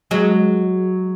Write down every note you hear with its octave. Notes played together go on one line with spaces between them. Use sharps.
F#3 G#3